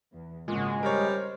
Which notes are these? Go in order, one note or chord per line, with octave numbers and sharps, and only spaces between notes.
E2
G#1 A#2 C#3 G#3 F#4
G3 A#4 C5 C#5